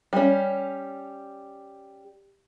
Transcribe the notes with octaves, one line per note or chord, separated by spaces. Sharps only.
G3 C#4